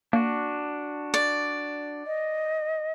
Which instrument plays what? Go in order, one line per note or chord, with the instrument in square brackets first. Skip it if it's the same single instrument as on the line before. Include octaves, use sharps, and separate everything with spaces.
[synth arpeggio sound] A#3 [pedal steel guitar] D4 F#4
[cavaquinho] D5
[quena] D#5